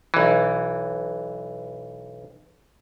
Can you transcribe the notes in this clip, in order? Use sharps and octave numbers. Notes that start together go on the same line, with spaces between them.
B1 E3